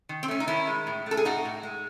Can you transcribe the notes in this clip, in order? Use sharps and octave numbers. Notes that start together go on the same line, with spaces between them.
D#3
C4
A3 C#4
D#4
D#3 C#4 E4
G#3
A2
A3 A4
G#4
A2 D#4 F#4
A2
G#3